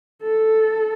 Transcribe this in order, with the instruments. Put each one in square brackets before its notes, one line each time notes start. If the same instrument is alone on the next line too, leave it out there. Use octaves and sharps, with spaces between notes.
[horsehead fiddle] A4